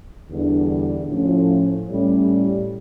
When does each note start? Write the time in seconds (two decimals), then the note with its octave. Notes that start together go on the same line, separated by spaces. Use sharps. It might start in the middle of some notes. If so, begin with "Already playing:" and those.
0.30 E2 D3 G3 D4
1.09 A2 F3 C#4
1.88 A2 G3 C#4